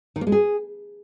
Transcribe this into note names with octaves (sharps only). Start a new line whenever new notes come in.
D#3
A#3
G#3
G#4